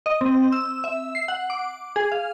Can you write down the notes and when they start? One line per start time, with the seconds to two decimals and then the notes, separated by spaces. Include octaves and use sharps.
0.06 D#5
0.21 C4
0.52 E6
0.84 E5
1.15 C7
1.28 F#5
1.50 D6
1.96 G#4
2.12 F5